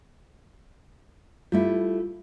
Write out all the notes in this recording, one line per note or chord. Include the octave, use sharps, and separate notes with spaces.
G3 A3 E4 F4